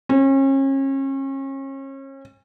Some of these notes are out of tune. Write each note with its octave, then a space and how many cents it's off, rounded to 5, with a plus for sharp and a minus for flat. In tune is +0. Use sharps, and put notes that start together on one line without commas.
C#4 -35